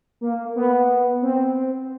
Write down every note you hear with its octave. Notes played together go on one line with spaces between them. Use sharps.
A#3
B3
C4